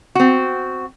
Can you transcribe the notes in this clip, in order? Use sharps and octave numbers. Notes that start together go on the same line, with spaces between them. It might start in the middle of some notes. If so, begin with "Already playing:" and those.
C4 F#4